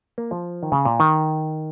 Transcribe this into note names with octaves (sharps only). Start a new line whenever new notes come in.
A#3
F3
D#3
C#3
A#2
D#3